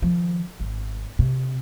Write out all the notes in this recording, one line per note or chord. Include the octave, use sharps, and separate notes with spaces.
D#3 F3
G#1
C3